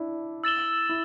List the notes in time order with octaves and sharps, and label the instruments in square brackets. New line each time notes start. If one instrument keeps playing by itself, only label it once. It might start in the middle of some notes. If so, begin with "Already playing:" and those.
Already playing: [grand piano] D4 E4
[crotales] E6 A6 E7 G7
[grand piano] E4